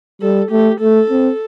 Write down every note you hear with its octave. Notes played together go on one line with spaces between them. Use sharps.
G3 A4
A3 G4
A3 A4
C4